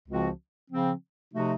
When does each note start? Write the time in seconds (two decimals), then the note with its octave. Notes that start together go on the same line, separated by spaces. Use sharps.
0.08 C#2 C#3 F3 C4 F#4
0.70 C#3 F3 C4
1.33 C3 F3 A3 D#4 F#4